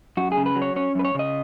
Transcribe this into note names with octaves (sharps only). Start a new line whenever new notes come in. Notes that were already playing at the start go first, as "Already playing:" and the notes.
F#2 F#4
G#4
C#3
B4
F#3
C#5
C#4 C#5
F#2 B4
C#5
C#3 D#5